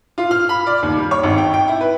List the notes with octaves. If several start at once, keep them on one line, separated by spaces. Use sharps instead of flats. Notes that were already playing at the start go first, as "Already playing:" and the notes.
F4
F6
B5
D5
D#2
G3
C#5
G#1
G5
G5
E4
B4